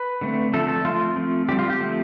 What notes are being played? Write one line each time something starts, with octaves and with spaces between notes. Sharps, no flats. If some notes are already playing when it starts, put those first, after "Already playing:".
Already playing: B4
D3 A3 C4
D3 F3 A3 C4 A4
A4
F3 A3 C4 F4
F3 A3 C4
D3 G3 C4 G4
F4
G4
F3 A3 C4